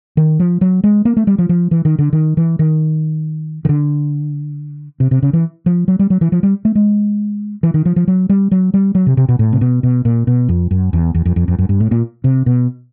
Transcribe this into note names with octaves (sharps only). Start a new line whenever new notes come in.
D#3
F3
F#3
G#3
A#3
A3
G3
F3
F3
E3
D#3
D3
D#3
E3
D#3
D#3
D3
C3
C3
C#3
E3
F3
F#3
G3
F#3
E3
F3
G3
A3
G#3
E3
D#3
F3
F3
F#3
G3
F#3
G3
F#3
C3
C3
B2
A2
C3
B2
B2
A#2
B2
F2
F#2
E2
E2
F2
F2
F2
F#2
G2
A2
A#2
C3
B2